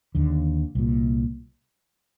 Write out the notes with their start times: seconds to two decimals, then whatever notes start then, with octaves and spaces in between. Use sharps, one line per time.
0.15 D#2 D3
0.75 C2 A#2